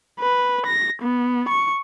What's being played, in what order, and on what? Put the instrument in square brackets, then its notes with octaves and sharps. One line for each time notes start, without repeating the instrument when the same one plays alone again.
[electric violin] B4
A#6
B3
C#6